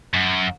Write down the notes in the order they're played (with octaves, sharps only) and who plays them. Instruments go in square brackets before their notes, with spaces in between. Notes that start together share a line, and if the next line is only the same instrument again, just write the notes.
[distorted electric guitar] F#2